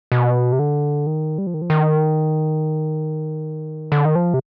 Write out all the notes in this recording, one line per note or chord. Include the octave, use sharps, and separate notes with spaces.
B2
C3
D3
D#3
G3
F3
D#3
F3
D#3
D3
D#3
F3
C3